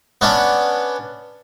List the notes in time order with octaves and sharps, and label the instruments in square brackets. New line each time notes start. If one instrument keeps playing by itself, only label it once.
[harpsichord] B3 C#4 D4